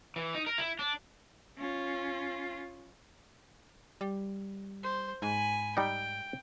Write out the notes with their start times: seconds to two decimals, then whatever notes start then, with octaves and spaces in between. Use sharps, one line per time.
0.16 E3
0.35 D#4
0.47 A#4
0.58 E4
0.79 D4
1.59 C#4 F4
4.01 G3
4.83 C5
5.22 G#2 G#5 B5
5.77 G3 D#4 G5